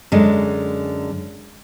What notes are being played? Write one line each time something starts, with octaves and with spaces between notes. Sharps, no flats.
F#2 D3 G#3